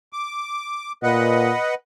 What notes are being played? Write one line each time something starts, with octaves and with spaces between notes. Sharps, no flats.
D6
A#2 B4 D#5 F#5